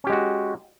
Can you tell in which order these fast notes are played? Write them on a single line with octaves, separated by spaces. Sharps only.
C#4 G4 G#3 F#4